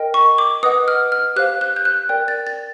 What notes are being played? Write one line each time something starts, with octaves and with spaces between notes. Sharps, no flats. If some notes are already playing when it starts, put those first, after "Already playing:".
Already playing: A#4 D#5 G5
C#6
D6
B4 D#5 F#5 D#6
F6
F6
G4 C5 F5 F#6
F#6
G6
F#6
A#4 D5 G5
A6
A6